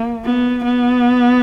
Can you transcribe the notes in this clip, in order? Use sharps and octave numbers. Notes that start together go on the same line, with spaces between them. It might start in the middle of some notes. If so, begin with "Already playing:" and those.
Already playing: A#3
B3
B3